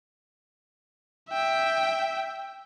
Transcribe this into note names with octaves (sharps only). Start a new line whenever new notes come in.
E5 G5